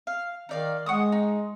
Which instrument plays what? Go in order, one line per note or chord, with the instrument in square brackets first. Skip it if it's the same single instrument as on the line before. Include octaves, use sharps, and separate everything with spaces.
[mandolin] F5
[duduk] D#3 [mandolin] D#4 D5 F5
[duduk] G#3 [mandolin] F#5 C#6 D#6
[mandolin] D#4